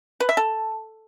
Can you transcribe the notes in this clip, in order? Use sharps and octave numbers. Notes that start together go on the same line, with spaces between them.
B4
E5
A4